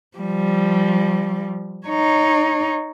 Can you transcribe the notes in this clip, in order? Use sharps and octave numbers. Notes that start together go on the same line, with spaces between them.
F3 G3
D#4 C#5